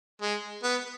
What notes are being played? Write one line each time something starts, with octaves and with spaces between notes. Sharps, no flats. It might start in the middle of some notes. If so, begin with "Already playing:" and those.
G#3
B3